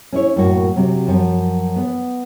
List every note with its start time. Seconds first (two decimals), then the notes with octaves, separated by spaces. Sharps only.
0.13 C#4 E4 C#5
0.36 F#2 A2 A#3 F#4
0.76 C3 F#3 C4
1.07 F#2 F3 F#3
1.76 B3